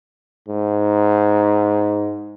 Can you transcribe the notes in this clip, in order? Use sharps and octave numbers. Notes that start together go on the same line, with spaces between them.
G#2